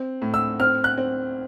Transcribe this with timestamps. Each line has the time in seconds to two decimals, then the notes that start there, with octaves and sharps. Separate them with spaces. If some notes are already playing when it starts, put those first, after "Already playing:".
Already playing: C4
0.22 A2
0.34 E6
0.60 C4 F6
0.84 F#6
0.98 C4